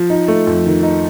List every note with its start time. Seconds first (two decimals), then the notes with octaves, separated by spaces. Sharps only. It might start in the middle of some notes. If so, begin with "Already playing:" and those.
Already playing: F3
0.10 D#4
0.28 A3
0.47 F2
0.66 D#3
0.83 D#4